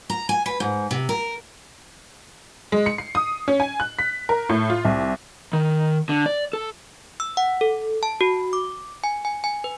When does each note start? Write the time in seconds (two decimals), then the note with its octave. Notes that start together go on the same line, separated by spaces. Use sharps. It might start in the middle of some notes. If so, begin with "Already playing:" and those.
0.10 A#5
0.29 G#5
0.46 B4
0.60 G#2
0.91 C3
1.09 A#4
2.72 G#3
2.86 C#7
2.98 C7
3.15 D#6
3.48 C#4
3.60 G#5
3.80 F#6
3.99 B6
4.29 A#4
4.49 A2
4.70 F4
4.85 C2
5.53 D#3
6.09 D3
6.26 D5
6.53 A4
7.20 E6
7.37 F#5
7.61 A4
8.03 A5
8.21 F#4
8.53 D6
9.04 G#5
9.25 G#5
9.44 G#5
9.64 B4